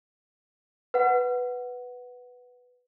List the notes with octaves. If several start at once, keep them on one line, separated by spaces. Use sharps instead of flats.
B4 F#5